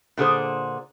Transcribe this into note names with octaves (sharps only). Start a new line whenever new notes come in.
A#2 D3 G#4 C5